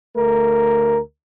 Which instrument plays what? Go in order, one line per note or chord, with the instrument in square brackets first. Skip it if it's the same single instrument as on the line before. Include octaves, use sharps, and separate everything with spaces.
[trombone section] D2 A3 A#4